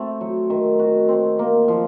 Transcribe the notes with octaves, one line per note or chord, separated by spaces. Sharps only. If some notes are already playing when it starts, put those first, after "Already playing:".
Already playing: A3 C4
F#3
D#3
F#4
C4
A#3
F3